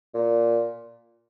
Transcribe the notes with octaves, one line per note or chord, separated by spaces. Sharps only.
A#2